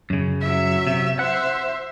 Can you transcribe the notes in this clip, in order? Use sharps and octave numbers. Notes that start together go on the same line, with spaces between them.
F#2 C#3
F#3 E5
C3
C5 E5 F#5